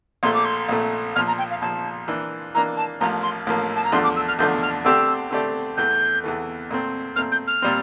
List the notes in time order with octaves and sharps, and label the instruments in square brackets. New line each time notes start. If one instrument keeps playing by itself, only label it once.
[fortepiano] A#1 A#2 A3 [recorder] C6
[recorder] D6
C6
[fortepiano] A#1 A#2 A3
[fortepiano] A#1 A#2 F3 [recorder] F6
[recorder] A#5
G5
F5
[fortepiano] A#1 A#2 F3 [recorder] A5
[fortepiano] E3 A#3 D4
[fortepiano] E3 A#3 D4 [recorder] A#5
[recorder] A5
[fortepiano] A1 A2 F3 A#3 [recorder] A#5
[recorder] C6
[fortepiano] A1 A2 F3 A#3
[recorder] A5
A#5
[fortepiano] E2 D3 F3 A3 D4 [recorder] C6
[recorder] D6
E6
F6
[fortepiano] E2 D3 F3 A3 D4 [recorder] G6
[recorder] F6
[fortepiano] D3 A3 C4 G4 D5 [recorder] E6
[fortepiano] D3 A3 C4 G4 D5
[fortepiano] E2 E3 A3 [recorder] G6
[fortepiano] E2 E3 A3
A#2 A3 C4
[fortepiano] A#2 A3 C4 [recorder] F6
[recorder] G6
F6
[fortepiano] A#2 G3 C4